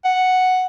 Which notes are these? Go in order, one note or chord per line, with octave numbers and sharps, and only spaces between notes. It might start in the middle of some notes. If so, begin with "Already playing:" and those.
F#5